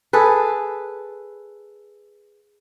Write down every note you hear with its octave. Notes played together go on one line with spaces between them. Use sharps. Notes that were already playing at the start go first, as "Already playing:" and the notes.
G#4 A4 B4